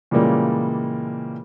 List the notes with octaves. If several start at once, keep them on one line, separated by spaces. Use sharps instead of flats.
A#2 C#3 E3 G3 G#3 A#3